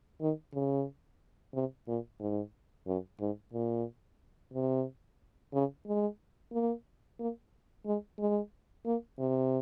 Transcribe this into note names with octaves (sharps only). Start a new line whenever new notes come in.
D#3
C#3
C3
A#2
G#2
F#2
G#2
A#2
C3
C#3
G#3
A#3
A#3
G#3
G#3
A#3
C3